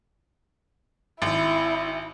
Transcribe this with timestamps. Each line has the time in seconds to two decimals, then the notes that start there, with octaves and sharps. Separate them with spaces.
1.22 G#1 E4